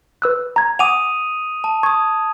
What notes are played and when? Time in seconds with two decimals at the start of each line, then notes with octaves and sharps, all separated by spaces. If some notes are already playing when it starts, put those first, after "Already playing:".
0.22 B4 E6 F#6
0.56 A#5 G#6
0.79 F#5 G#5 D6 D#6 D#7 F7
1.64 A5
1.83 C#6 D#6 G#6